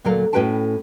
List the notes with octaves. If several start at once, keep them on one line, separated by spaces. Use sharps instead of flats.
D2 A#2 F#3 A4 A#4 F5
A2 C#4 F#4 B4 G5 A5